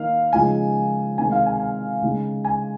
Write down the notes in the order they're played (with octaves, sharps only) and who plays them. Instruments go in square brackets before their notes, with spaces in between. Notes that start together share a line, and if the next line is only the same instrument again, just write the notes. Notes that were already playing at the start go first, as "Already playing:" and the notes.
Already playing: [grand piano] D#3 A#3 D#4 F5
C#3 F3 G#3 D#4 G#5
C3 D#3 G#3 D#4 G#5
F5
G#5
G#5
C#3 G#3 D#4
G#5